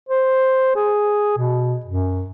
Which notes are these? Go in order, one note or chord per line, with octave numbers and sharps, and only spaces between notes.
C5
G#4
B2
F#2